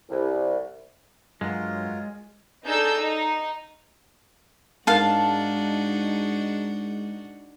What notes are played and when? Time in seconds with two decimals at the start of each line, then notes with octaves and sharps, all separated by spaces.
0.09 C2
1.41 G2 F#3 G#3 F4 A#4
2.66 D4 D#4 G#4 A4 E6 G6
2.97 D#4
4.87 G#2 G#3 D4 D#4 F#4 A#4 F5 A5